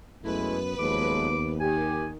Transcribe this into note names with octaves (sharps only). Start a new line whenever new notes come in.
F#2 A2 G#3 A3 B3 E4 B4
D#2 F3 F#3 G#3 D6
D#3 G4 G#5